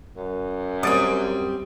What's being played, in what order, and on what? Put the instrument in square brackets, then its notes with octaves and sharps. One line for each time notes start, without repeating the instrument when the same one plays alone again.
[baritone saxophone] F#2
[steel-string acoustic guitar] G3 C4 [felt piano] D#6 A6 D7